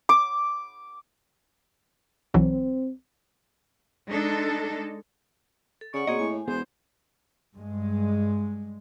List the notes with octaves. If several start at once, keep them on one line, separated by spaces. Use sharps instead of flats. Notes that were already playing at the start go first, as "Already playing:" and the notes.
D6
B1 E3 F#3 C4
G#3 D4 D#4 A4
A4
C#3 D5 F#5 C#6
B2 A#3 C4 G#4 C#5 D#5
A2 G#5
E1 B3 G#4 C5
G2 G#3